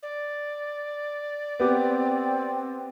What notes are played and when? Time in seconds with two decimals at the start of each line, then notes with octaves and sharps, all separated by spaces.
0.02 D5
1.60 B3 C4 G4